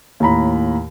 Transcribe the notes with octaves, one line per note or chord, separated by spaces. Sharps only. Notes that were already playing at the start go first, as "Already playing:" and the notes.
D#2 A2 A#5 B5